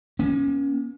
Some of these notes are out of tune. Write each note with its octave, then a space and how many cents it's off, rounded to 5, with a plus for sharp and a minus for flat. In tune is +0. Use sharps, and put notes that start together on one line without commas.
A#3 +45 C#4 +0